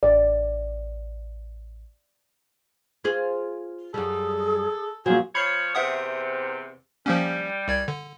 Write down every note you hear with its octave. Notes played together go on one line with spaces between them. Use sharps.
A1 D5
F4 G#4 C5
F#2 G3 G#4 A4
A#2 F3 F#3 F#4 G#4
F3 C#5 B5 C7
E2 C3 E5 F#5 D#6
F3 G3 A#3 C#4
C2 D5 G#6
D3